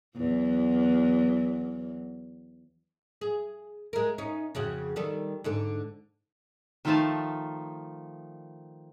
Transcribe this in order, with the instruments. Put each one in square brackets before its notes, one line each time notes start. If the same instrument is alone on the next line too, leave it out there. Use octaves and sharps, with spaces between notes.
[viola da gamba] E2 F#3
[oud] G#4
G#3 A#4
C#4 D#4
F2 C#3 F#4
D#3 G3 A4
G#2 D3 A4
[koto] D#3 F3 A3 D#4 F5 A5